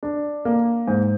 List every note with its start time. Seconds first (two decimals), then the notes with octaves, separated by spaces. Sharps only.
0.03 D4
0.45 A#3
0.88 G#2